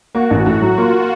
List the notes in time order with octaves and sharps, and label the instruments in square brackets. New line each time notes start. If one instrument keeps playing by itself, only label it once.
[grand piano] A#3 [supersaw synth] F#4
[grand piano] A1
A2
F#3
[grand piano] A#3 [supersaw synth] F4